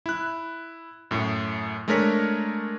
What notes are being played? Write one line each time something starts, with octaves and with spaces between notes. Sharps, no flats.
E4 F#6
F#2 A2
G#3 A3 D4 A#4 C#5 B6